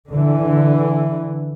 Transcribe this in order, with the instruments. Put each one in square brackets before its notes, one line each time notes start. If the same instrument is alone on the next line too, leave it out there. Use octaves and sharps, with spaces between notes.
[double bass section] D3 E3